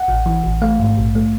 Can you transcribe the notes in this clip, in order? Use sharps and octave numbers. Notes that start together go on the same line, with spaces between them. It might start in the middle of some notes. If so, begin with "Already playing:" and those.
Already playing: F#5
A1
E3
A1
A3 F5
G#2
A#1
A3